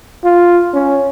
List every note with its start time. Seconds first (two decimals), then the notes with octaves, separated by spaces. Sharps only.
0.24 F4
0.74 C#4